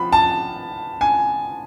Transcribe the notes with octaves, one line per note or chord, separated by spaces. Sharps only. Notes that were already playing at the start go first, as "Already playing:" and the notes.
Already playing: F3 B5
A5
G#5